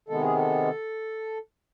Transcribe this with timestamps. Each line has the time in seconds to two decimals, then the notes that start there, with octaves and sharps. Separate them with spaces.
0.09 C3 D#3 G#3 B3 A4
0.22 G#4
0.36 A4